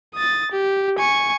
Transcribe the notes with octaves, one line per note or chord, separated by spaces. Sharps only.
D#6 A6
G4
G#5 C#6